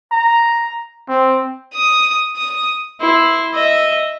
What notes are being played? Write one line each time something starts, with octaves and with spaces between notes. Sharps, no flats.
A#5
C4
D#6
D#6
E4 C6
D#5 E5